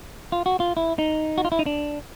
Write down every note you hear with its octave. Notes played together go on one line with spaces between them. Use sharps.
F4
F#4
F4
E4
D#4
F#4
F4
E4
D#4
D4